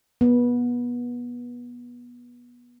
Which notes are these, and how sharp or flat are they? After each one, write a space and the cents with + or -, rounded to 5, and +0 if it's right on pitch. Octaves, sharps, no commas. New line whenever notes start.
B3 -25